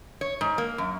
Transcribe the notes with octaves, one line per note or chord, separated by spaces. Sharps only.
C#5
G#2
A#3
F#2